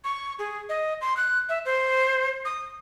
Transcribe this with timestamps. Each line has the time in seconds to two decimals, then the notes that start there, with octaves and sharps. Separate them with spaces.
0.04 C#6
0.39 G#4
0.69 D#5
1.01 C6
1.17 F#6
1.49 E5
1.65 C5
2.45 D#6